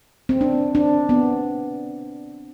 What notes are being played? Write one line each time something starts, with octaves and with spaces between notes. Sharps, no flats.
C4
D4
D4
B3